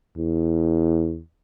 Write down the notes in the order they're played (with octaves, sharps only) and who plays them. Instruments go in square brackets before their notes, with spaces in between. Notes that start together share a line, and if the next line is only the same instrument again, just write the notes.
[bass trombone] E2